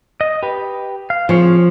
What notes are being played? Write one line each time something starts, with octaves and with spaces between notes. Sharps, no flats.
D#5
G4 B4
F5
F3 C4 G#4 C#5